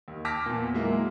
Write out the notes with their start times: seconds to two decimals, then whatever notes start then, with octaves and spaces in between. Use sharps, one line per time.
0.08 D#2
0.25 A5 D6 F6 A#6 B6
0.46 E2 A#2
0.74 F#3 G#3 A#3 E4